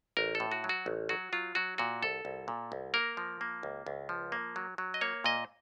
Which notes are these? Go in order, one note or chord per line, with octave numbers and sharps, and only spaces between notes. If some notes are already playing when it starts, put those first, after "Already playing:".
A1 A#4
A4
A2
F#4
F#3
F#4
A1
F#3 F#4
F#3 F4
F#3 F#4
A#2 F#4
C2 A4
C2
A#2
C2
A#3 A#4
F3
A#3
C#2
C#2
F3
A#3
F#3
F#3
D#5
A#3 C#5
A#2 D#5